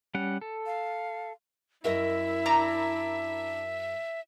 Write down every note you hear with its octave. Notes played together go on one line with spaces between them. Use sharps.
G3 C#4 F#5
A4
F5
F#2 E4 A#4 D#5 E5
D4 A#5